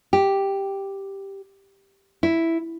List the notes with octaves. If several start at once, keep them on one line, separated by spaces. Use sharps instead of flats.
G4
E4